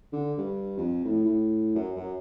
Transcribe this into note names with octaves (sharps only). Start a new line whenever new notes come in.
D3
G2
F2
A2
A2
F#2
F#2